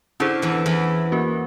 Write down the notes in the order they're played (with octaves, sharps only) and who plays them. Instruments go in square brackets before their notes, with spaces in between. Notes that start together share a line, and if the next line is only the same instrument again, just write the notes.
[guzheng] D3 [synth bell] C#4 E4 G#4 C5
[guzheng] E2 E3
E2 E3
[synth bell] A#3 C#4 F#4 A#4